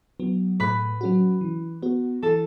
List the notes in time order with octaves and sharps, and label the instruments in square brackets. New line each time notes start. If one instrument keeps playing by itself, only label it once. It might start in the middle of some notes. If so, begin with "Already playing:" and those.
[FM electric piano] F#3 B3
[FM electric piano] A2 [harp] B4 B5
[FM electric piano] F#3 C#4 F#4
E3
B3 F#4
[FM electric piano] E3 [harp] A4 A5